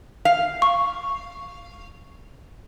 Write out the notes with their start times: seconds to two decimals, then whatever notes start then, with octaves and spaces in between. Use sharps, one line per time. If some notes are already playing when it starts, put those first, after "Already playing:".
0.25 F5
0.62 C#6